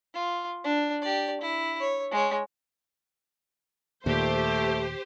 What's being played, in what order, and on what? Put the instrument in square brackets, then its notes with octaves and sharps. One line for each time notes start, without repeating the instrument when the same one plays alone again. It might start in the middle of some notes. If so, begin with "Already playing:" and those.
[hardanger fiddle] F4
D4
G4 D5
E4
C#5
G#3 C#5
[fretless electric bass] D#2 A#2 [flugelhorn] A3 [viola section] G4 C5